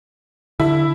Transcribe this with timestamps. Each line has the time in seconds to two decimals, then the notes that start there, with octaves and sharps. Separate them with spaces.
0.60 D3 E4